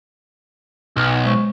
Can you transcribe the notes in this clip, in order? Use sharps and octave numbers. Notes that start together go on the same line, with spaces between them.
B1
G#3 C5 C#6